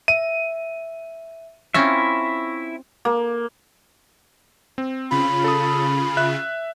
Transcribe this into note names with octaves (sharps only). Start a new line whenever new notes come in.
E5 D#7
C4 C#4 E4 F4 E5 C#6 A#6
A#3
C4
C#3 F4 B5
A4 A5 D#6
E5 F#6